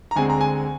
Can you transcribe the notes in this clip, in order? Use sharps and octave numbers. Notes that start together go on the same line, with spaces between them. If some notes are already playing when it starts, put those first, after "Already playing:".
A#5
D2 D3 G#3 C4 G#5
A#5
G#5